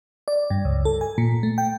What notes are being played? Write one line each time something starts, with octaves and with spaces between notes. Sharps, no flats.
D5
G2
C#2
A4
G#5
A#2
A3
G5